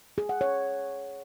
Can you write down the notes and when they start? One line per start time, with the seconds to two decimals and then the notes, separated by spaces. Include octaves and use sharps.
0.18 G#4
0.29 F#5
0.41 C#5